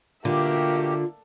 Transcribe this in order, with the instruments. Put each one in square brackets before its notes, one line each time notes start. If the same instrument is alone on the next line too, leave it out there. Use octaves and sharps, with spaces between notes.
[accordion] B2 G4 [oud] D3 [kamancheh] A#3 E5 [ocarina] F4